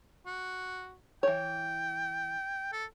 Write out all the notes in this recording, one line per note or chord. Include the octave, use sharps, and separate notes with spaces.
F#4
E3 C#5 G5
A4